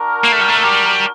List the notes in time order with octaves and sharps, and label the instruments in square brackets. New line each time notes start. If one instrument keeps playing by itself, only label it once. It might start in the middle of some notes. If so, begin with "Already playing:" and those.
Already playing: [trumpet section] D4 F#4 A#4
[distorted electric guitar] A#3
A3
G3
A3
G3